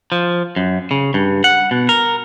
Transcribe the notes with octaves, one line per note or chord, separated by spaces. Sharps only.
F3
F#2
C#3
G2
F#5
B2
A#4